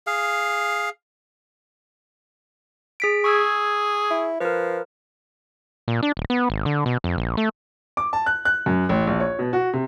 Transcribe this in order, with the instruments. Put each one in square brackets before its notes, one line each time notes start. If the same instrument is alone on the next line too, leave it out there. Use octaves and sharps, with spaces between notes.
[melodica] G#4 F5
[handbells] G#4 B6 D7
[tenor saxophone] G#4 [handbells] C#6 E6 G#6
[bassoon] E4
[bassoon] F3 [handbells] A#4 B4
[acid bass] A#2
D4
D1
B3
G#1
D3
B2
F2
A#1
A3
[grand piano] D6
A5
F#6
F#6
F#2
A1
A#1
C#5
B2
F#4
C3